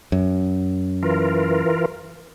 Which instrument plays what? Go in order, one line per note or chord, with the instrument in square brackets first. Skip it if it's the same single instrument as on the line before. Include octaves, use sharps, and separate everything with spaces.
[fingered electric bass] F#2
[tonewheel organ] E3 F4 A#4